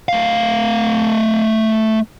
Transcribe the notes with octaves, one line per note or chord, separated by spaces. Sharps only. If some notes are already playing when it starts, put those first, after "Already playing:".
A3 F5